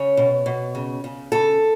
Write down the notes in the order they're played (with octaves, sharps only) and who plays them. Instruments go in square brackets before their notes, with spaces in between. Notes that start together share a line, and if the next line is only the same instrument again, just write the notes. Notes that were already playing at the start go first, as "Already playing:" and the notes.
Already playing: [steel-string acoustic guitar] C#3 C#5
B2
B2
C#3
C#3
C#3 A4